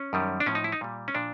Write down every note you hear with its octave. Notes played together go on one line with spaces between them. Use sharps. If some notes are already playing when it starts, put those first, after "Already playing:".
Already playing: C#4
F#2 D#3 G3
D4
A2 F3 C#4
D#4
E4
D#4
A#2 G3
C#4
A#2 F3 D4